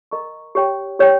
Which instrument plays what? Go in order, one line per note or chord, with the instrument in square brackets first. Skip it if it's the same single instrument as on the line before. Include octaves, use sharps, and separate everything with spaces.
[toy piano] A#4 D#5 A#5 C#6
G4 C#5 G5
G4 C#5 G5